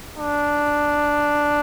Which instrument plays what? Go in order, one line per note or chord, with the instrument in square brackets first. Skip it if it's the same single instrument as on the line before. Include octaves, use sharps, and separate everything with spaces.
[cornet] D4